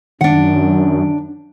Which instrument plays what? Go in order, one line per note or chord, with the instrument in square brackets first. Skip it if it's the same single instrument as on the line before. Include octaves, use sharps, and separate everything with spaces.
[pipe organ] F#2 [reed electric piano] D#3 [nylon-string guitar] D4 F#5